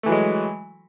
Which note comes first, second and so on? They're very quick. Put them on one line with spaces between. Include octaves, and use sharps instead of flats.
A3 E3 F#3 G#3